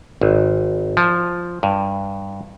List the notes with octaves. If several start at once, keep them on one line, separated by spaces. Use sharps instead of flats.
G#1
F3
G2